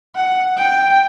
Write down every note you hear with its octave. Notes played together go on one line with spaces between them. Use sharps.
F#5
G5